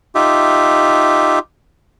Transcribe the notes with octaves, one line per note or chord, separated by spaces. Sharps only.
D#4 F4 G4 E5